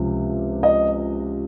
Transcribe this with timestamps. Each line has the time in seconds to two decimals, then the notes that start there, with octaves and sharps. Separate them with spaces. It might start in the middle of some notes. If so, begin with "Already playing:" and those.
Already playing: C#2 C3 F3
0.63 D#5